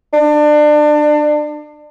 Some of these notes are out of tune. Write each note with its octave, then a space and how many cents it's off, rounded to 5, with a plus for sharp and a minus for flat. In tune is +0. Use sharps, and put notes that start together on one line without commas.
D4 +30